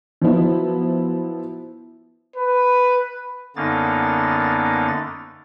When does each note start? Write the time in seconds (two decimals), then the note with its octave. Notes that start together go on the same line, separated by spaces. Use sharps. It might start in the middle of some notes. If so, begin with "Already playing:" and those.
0.21 F3 F#3 B3 E4
2.36 B4
3.56 F#2 D3 A#3 B3 D#4 A6